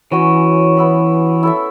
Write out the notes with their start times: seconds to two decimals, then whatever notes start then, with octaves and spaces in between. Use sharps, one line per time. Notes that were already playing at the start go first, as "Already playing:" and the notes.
0.11 E3 C#4 F#4 C#5
0.77 B3 E4 B4
1.43 E4 A4 E5